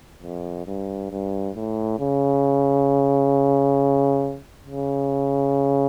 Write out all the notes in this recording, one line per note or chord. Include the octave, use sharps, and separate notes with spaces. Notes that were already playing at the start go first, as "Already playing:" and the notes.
F2
G2
G2
A2
C#3
C#3